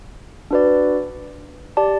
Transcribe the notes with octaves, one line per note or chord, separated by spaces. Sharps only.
D4 F#4 B4 D5
G4 D5 A5